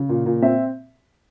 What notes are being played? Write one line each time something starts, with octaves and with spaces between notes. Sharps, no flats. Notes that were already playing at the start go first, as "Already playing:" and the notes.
Already playing: C#3
A#2
A#2
C4 E5